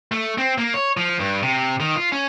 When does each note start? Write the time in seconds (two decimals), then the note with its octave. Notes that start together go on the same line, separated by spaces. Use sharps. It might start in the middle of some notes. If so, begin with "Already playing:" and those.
0.12 A3
0.38 C4
0.58 A#3
0.74 C#5
0.97 F3
1.19 G2
1.43 C3
1.80 D#3
1.96 F4
2.12 C#4